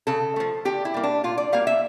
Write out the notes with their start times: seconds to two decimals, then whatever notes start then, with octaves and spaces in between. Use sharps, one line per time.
0.07 C#3 A4
0.36 F3 A3
0.65 D3 G4
0.85 E4
0.94 G3 A#3
1.03 D4
1.24 A#2 F4
1.38 D5
1.52 G3 A#3 F5
1.67 E5